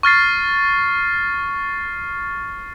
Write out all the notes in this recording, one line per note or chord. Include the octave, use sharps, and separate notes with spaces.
C#6 F6 A6 C7